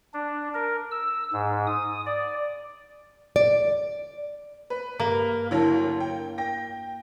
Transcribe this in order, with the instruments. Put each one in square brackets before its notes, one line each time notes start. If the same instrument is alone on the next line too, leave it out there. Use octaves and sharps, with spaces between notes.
[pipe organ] D4
A#4
E6
G#2
D#6
D5
[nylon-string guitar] D5
[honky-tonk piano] B4
[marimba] G2 [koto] A#3
[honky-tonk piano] D2 F#3 [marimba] E4 A5
[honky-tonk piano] G5
G5 A#6